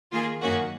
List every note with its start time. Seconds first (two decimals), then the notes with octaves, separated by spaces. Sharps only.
0.12 D#3 A#3 F4 G#4
0.41 F#2 D#3 A#3 C#4 F#4